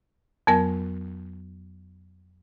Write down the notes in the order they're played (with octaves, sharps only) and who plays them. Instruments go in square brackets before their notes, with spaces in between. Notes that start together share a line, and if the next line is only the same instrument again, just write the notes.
[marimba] F2 F#3 B3 A#4 G#5